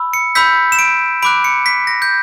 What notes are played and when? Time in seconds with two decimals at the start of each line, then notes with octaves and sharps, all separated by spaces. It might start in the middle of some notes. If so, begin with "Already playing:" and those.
Already playing: B5 E6
0.13 C#7
0.35 B5 E6 G6 B6
0.72 E7
0.79 D7
1.22 B5 D6 F#6 D7
1.44 C#7
1.66 B6
1.87 A#6
2.02 G6